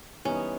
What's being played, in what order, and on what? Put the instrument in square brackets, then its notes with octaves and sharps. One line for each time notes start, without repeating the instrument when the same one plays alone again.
[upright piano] E3 G3 B3 D#4 [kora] C#4